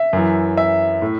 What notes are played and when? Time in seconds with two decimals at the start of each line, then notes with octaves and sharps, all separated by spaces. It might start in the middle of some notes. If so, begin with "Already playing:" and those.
Already playing: E5
0.13 F#2 E3
0.57 E5
1.02 A2